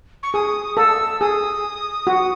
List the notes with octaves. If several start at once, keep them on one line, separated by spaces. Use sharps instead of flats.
C#6
G#4 D#6
A4 E6
G#4 D#6
F#4